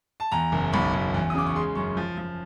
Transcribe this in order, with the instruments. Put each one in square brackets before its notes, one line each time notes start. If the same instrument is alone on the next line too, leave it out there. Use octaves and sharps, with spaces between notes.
[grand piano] A5
E2 A#5
F#1
B1 B5
B1
E2
D#6
C#3 D6
C#6
G#3 C6
F#2 C#6
F3
F3